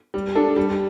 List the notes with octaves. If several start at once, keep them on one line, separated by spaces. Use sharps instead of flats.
G3
D4 A4
G3